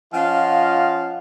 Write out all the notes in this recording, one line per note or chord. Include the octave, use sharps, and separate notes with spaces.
F3 C#4 F4 D#5 F5 F#5